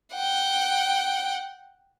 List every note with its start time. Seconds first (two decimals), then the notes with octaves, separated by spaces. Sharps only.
0.15 F#5 G5